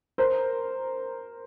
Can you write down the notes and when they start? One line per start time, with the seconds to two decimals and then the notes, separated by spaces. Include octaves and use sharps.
0.18 A#4 C5